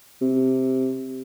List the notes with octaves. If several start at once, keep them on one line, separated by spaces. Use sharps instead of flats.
C3